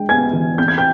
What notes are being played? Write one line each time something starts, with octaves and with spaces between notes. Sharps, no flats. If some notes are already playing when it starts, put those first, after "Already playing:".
Already playing: G#3 D4 G5
B3 G#5 G#6
E3
C4 G6
G#6
G5 G6